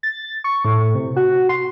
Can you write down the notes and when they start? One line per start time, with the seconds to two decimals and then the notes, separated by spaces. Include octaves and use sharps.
0.03 A6
0.44 C#6
0.65 A2
0.95 C3
1.16 F#4
1.49 C6